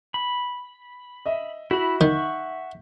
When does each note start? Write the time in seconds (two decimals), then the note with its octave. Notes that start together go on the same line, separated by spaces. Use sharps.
0.14 B5
1.26 D#5 E5
1.71 E4 F#4 B5
2.01 D#3 E5 F#5 C#6 G6